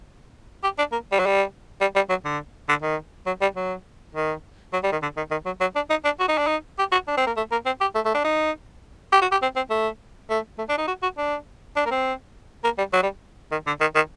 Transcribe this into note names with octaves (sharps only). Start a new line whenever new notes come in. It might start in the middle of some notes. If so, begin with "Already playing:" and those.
G4
D4
A#3
G3
F#3
G3
G3
G3
F#3
D3
D3
D#3
F#3
G3
F#3
D#3
F#3
G3
D#3
D3
D#3
D#3
F#3
F#3
D4
D#4
D4
F#4
D#4
D4
D#4
G4
F#4
D4
C4
A#3
A3
A#3
C4
G4
A3
A3
D4
D#4
G4
F#4
G4
C4
C4
A3
A3
A3
D4
D#4
F#4
F#4
D4
D4
A#3
C4
A#3
G3
F#3
G3
D#3
D3
D#3
D#3